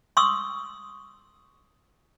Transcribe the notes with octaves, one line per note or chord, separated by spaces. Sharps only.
C6 C#6 D#6 E6